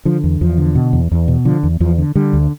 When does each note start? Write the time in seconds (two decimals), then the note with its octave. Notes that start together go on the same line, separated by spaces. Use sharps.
0.05 D3 F3
0.24 E2
0.41 E2 F3
0.58 D3
0.75 B2
0.93 E2
1.11 E2
1.28 B2
1.45 D3 F3
1.63 E2
1.80 E2 F3
1.98 D3
2.15 D3 G3
2.33 D2